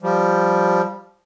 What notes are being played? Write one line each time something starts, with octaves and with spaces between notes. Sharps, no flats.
F3 G3